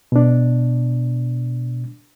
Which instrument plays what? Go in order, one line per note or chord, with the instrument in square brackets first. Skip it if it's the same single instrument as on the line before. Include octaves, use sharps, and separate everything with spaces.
[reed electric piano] B2 D4